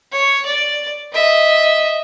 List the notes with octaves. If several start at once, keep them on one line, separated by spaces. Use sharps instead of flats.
C#5
D5
D#5 E5